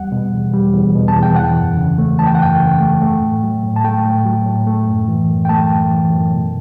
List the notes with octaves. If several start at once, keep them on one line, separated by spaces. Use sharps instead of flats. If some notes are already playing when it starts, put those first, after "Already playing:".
Already playing: E2 G3 F#5
B2
E2
G3
E2
B2
A5
E2
G5
E3 F#5
F#2
C#3
A3
E3 A5
G5
F#5
F#2 G5
C#3
A3
A3
A2
F#3
A2
A5
A3 G5
A2
F#3
A2
A3
F#2
E3
F#2
G5
A3 A5
F#2
E3
F#2
B2